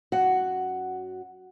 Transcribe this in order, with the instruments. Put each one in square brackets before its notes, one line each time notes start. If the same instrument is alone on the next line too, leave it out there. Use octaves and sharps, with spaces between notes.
[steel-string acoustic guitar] F#2 F#4 F#5